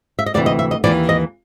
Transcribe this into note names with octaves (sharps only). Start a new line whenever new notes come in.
E5
D#5
D2 C3 E3 D5
D#5
E5
D#5
D#2 C#3 E3 D5
D#5